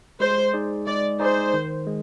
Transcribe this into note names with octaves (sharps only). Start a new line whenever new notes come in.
G#3 C5
D#4 G#4 D5
G#3 D5
D#4 G#4 C5 D5
D#3
G#3